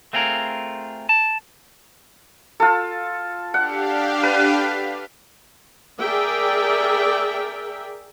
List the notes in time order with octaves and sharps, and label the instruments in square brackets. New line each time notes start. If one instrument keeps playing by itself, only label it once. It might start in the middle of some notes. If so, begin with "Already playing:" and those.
[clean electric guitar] A3 C4 F4 G#4 A#4
A5
[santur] F4 A4
[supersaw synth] D4 G4 F5 [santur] F#5
[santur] B4
[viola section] G#4 A#4 D5 E5 G5